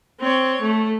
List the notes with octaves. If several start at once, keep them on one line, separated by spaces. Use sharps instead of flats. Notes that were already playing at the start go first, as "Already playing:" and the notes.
C4 C#5
A3